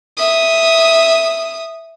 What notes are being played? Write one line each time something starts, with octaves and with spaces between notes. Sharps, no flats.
E5 D#6